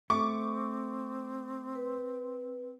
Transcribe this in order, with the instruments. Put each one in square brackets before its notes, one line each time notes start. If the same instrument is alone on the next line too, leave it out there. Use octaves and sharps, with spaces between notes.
[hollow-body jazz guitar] A3 [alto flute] C4 [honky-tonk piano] C#6 D6
[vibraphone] B4